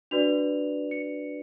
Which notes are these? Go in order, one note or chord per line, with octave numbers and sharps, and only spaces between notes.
D4 F#4 B4 D5 F7
C#7